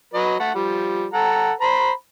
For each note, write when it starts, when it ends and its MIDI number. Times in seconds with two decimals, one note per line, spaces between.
0.14 0.36 54
0.14 0.36 71
0.14 0.36 75
0.40 0.52 57
0.40 0.52 78
0.55 1.07 53
0.55 1.07 55
1.13 1.52 69
1.13 1.52 78
1.13 1.52 82
1.61 1.91 72
1.61 1.91 82
1.61 1.91 83